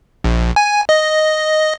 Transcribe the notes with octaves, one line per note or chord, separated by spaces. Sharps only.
A#1
G#5
D#5